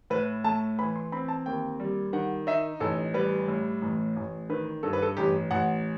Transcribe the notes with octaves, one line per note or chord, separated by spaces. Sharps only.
A2 B4
A3 A5
E3 B5
C6
C4 B5
A5
D#2 G5
G3
D#3 F#5
D#4 E5
A1 A4
G3 B4
A2
A1
A1
D#3 B4
G2 A4
B4
A4
A1 G4
A1 F#5